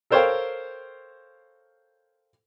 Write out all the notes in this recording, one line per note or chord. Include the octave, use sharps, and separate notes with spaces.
A4 A#4 C5 C#5 F5 G5